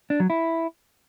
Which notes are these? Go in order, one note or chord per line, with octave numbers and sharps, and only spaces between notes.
D4
F#3
E4